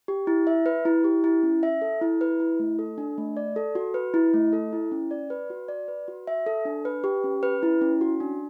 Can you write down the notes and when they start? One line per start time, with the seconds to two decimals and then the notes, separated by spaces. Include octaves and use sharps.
0.08 G4
0.27 E4
0.47 E5
0.66 B4
0.85 E4
1.04 G4
1.24 E4
1.43 C#4
1.63 E5
1.82 A4
2.02 E4
2.21 B4
2.40 E4
2.59 A3
2.79 A4
2.98 D4
3.18 A3
3.37 D5
3.56 A4
3.75 F#4
3.94 B4
4.14 E4
4.33 A3
4.53 A4
4.73 E4
4.92 C#4
5.11 D5
5.30 B4
5.50 F#4
5.68 D5
5.88 B4
6.08 F#4
6.27 E5
6.46 A4
6.65 D4
6.85 B4
7.04 G4
7.24 C#4
7.43 B4
7.63 E4
7.81 C#4
8.01 F#4
8.20 D4